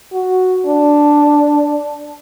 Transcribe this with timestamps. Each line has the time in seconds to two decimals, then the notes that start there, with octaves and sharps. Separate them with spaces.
0.13 F#4
0.67 D4